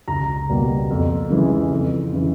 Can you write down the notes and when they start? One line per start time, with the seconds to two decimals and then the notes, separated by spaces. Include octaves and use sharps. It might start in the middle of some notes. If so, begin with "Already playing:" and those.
0.08 C#2 A#5
0.49 B2 G3 A#3
0.90 F2
1.30 C#3 E3 G#3
1.72 F2
2.13 C#3 E3